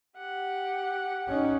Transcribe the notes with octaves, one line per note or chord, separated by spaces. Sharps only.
G4 F#5
C#4 D#4